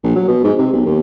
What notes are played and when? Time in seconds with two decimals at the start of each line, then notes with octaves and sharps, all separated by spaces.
0.04 A#1
0.16 F#3
0.28 B2
0.43 G#2
0.58 C3
0.73 B1
0.86 D#2